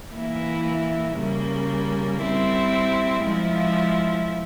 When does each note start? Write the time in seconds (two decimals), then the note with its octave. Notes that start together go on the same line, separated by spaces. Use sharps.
0.13 E3 A#3 E4
1.17 C#3 G3 A#3
2.22 G3 C4 E4
3.25 F3 G#3 E4